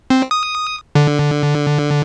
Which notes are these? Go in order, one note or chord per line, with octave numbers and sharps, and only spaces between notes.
C4
D#6
D3